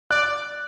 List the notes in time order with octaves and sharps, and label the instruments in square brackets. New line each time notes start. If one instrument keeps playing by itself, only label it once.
[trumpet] D5 [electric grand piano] F#6